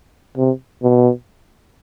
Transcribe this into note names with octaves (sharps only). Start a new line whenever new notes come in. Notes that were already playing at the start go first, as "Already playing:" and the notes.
C3
B2